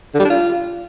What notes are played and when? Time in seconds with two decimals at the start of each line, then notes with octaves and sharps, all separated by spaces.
0.14 D3
0.20 G3
0.25 D4
0.30 F4